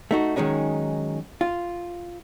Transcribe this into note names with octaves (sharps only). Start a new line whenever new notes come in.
A3 D#4 F#4
D#3 F#3 G#3 C#4 D#4
F4